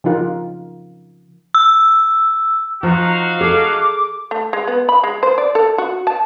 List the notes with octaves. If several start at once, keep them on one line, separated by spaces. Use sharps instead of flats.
C#3 F3 D#4 F4 A#4
E6
F3 D#4 F#4 F5 A#5
G#4 A4 D6
A3
G#3
B3
B5
G#3
C5
D5
A4
F#4
A5